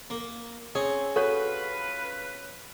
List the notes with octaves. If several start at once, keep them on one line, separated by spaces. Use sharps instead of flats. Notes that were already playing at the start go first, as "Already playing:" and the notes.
A#3
C4 C#4 G#4
C#3 F4 F#4 A4 B4 C#5